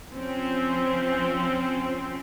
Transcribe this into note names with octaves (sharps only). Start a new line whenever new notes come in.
F3 C4 C#4